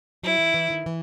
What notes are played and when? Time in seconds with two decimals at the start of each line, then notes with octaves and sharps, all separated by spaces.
0.23 F#3 E4
0.39 E3
0.54 E3
0.70 D#3
0.86 E3